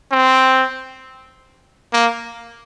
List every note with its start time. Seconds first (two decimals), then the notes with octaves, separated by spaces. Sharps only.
0.12 C4
1.93 A#3